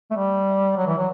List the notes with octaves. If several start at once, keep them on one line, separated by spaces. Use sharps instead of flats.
A3
G3
F#3
E3
F#3